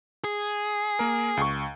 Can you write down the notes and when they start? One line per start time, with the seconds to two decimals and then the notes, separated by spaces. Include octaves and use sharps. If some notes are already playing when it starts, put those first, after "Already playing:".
0.24 G#4
0.99 A#3 A#4
1.37 C#2 C#6